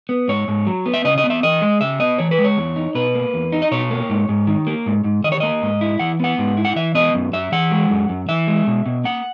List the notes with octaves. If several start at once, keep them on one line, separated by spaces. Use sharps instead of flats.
B3
G#2 C#5
G#2
F#3
B3
E5
C#3 D#5
D#5
B3
E5
E3 D#5
G#3
C#3 E5
B3 D#5
E3 C#5
B4
G#3
C#5
E2
D#4
B2 B4
A#3
E2
D#4
D#5
B2 C#5
A#3
G#2
G#2
D#3
A#3
G#2
G#2
D#3 D#5
C#5
A#3 D#5
G#2
E4
E3 F#5
B3 F#5
G#2
E4
F#5
E3 E5
B3 D#5
F#2
F#2 E5
E3 F#5
G#3
F#2
F#2
E3 E5
G#3
B2
B2
A#3 F#5